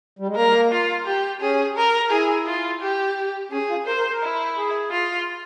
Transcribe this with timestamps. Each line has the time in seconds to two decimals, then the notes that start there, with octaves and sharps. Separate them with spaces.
0.19 G3
0.27 G#3
0.36 A#3 A#4
0.72 F4
1.06 G4
1.41 C#4 G#4
1.77 A#4
2.11 E4 G#4
2.47 F4
2.81 G4
3.52 C#4 G#4
3.69 F4
3.87 A#4 C5
3.98 A#4
4.11 A#4
4.22 E4
4.57 G#4
4.91 F4